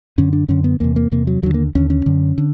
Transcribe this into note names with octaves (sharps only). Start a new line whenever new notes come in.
F#2 D3 C#4
D4
F#2 D3 C#4
B3
E2 C3 A#3
A#3
E2 C3 A#3
F#3
D#2 D3 F#3
A#3
D#2 D3 C#4
C#4
F#2 D3
D3